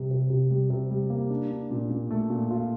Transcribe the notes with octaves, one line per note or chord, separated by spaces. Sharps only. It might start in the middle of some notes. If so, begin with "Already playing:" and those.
Already playing: C3 G3
C3
C3
G3
C3
G3
A#3
D4
D4
A#2
A#2
A3
A#2
F4